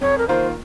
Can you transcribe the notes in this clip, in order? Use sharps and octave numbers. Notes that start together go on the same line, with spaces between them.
F2 C#5
A#4
D#3 A#3 F4 A#4 C5